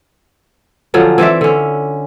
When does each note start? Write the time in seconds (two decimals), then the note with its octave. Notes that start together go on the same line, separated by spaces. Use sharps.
0.94 D3 F3 F#3 C#4
1.18 E3 C4 D5 E5
1.41 D3 C#4